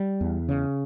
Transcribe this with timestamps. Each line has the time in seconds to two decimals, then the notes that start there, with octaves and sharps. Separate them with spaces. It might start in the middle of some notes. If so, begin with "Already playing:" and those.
Already playing: G3
0.21 E2
0.49 C#3